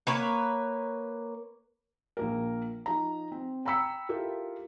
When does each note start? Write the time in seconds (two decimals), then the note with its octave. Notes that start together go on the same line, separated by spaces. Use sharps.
0.07 A#3 B4 C#5
2.17 A#1 A#3 A#4
2.86 F3 D#4 D#5 A#5
3.32 C4
3.65 G5 A#5 B5 E6 B6 C#7
4.09 E4 F4 G4 A4 A#4